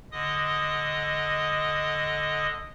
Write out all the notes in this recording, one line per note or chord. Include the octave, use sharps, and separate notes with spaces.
D3 D#5 D#6